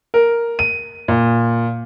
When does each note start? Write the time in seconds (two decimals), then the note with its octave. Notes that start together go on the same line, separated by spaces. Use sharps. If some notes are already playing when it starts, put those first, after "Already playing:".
0.14 A#4
0.59 D#7
1.08 A#2